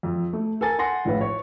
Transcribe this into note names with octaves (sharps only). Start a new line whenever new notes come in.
F2
A3
A4 A#4 G#5 A6
F#5 G#5 C6 A#6 C#7
A#1 A2 B4 F5
C#5